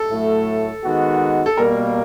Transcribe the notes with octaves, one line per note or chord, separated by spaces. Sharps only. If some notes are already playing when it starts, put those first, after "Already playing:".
Already playing: A4
A2 F#3 A3
D#3 G#3 B3 D#4 F#4
A4
B2 G3 A#3 A#4